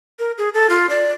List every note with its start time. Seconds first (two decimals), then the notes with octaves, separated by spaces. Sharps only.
0.19 A#4
0.38 G#4
0.54 A4
0.70 F4
0.90 D5